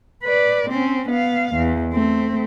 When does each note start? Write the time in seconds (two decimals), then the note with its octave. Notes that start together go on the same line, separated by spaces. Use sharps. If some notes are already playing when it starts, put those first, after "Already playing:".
0.23 B4 D5
0.70 C4 C#4
1.09 B3 F5
1.55 E2
1.93 A3 C4